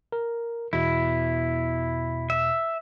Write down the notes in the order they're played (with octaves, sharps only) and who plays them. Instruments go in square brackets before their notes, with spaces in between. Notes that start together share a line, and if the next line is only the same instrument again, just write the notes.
[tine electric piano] A#4
[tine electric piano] E2 B2 [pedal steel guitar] E4
[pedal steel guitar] E5